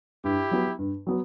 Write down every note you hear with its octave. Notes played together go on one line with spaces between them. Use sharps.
G2 E4 G4
F#3 B3 F#4
G2
F#3 B3